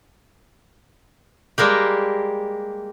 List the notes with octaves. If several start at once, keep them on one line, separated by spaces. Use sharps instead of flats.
G3 G#3 A#3 G4